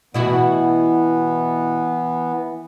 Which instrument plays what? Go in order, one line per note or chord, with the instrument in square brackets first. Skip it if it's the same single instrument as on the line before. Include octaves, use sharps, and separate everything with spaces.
[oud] B2 E4 F#4 [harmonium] E3 B3